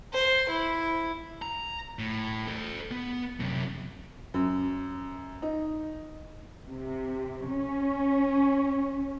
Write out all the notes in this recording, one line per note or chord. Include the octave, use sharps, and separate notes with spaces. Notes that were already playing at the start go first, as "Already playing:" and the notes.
C5
E4
A#5
A2
A4 C5
B3
F#2 C3
F#2
D#4
C3
C#4